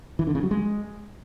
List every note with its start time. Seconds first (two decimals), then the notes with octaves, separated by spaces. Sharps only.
0.19 E3
0.27 D3
0.35 C#3
0.43 F#3
0.51 G#3